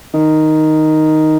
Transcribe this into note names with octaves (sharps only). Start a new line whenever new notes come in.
D#3